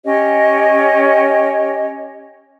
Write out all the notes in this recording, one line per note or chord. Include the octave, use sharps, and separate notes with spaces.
C#4 G4 C#5 D#5